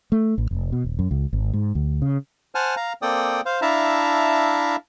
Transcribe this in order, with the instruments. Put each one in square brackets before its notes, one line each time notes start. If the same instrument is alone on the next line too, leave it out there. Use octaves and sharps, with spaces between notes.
[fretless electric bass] A3
A1
F1
B2
D#1
F#2
C#2
G#1
G#2
D2
C#3
[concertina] C5 F#5 G#5 A5 F6
F5 A#5
A#3 C4 A4 D5 G5 D#6
C5 F5
D4 E4 E5 F5 A5 A#5